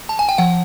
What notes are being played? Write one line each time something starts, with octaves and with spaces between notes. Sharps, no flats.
A5
G#5
G5
F3 F#5